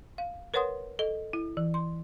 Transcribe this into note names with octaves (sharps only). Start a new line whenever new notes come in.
F5
A#4 B4 C#5 F#5 C6 D#6
A4 D#5
E4
E3
C6